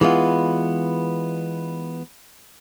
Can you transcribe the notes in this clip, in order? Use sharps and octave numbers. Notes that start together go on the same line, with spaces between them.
E3 G#3 B3 F4